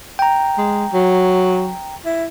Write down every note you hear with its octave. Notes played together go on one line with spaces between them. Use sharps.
G5 A#5
G#3
F#3
E4